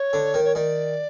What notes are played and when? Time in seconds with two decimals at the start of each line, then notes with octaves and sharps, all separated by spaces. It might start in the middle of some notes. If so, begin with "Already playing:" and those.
Already playing: C#5
0.13 D3
0.34 D#3
0.45 C#5
0.55 D#3 D5